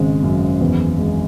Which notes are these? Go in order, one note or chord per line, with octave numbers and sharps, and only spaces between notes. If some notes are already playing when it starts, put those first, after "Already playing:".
Already playing: G#1 C#3 G#3
F#2
E2
G#3